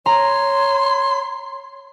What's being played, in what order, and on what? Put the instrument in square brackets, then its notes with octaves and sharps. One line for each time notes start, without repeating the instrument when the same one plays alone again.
[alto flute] C#5 [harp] A#5 [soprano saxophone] C6